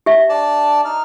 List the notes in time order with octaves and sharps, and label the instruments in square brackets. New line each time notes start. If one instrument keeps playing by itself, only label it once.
[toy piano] G4 E5
[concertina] D4 D5 A5
D#4 F6